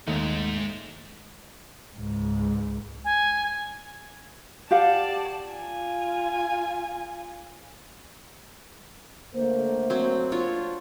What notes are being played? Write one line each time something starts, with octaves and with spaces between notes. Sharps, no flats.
D#2 G#2 A3 D#4
C#2 G#2
G#5
G4 D5 F5 F#5 A5
F4 G#5
D3 A3 A#3 C5
F#3 C4
D4 F4 C#5